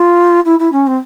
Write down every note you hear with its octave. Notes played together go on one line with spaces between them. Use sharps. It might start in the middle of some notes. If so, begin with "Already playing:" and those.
Already playing: F4
E4
E4
C#4
C4